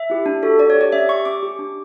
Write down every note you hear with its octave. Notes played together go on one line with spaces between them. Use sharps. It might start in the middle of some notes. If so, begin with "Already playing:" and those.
Already playing: E5
E4 G4
D4
F#4 A4
D4 D5
C#5
G4
D5
C#4 E5
G4 C#6
C#4 D6
G4
D4